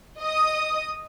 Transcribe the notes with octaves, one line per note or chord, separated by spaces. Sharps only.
D#5 D#6